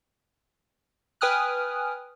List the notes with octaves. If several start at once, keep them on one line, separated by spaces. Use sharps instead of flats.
B4 G5 G#5 D#6 F6 F#6